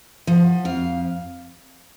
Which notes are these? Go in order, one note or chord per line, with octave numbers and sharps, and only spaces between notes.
F3 F#5
F2 F5